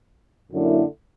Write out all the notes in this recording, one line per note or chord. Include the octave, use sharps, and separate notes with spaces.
F#2 D3 F#3 A#3 E4